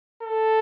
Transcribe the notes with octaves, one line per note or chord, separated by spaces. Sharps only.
A4